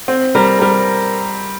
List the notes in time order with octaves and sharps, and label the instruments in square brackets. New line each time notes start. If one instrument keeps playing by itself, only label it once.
[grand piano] C4
[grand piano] G3 [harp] A#4
[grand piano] G3 [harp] A#4